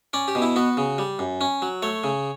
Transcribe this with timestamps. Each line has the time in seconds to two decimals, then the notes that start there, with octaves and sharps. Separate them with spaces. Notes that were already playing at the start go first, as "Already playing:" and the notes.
0.13 C#4 D5
0.28 G4
0.35 B2
0.42 E4
0.56 B3 F#4
0.77 C#3
0.98 G3
1.19 F#2
1.41 C#4
1.62 F#3
1.82 A3 C#5
2.04 C#3